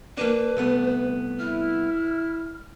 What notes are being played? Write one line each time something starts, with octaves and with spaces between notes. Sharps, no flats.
A#3 D4 B4
C2 A3 B3
E4 F6